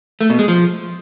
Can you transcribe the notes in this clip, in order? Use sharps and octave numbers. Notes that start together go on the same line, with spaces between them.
A3
B2
G#3
F3